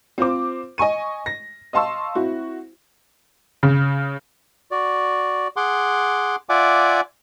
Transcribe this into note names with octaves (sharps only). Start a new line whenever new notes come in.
C4 F4 C5 D6
D#5 G#5 C#6 D#7
A#6
D#5 F5 A5 C6 C#6 E6
C4 E4 F#4
C#3
F#4 D5
G#4 F#5 C6 D6
F4 D5 E5 F#5 G#5 D6